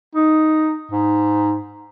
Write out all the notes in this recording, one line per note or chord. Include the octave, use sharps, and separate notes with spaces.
D#4
G#2